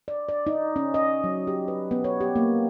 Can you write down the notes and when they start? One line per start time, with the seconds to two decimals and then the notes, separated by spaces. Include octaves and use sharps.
0.08 D5
0.29 D5
0.47 D#4
0.76 C#4
0.94 D#5
1.24 F#3
1.47 G4
1.68 B4
1.91 B3
2.04 C#5
2.21 G4
2.36 A#3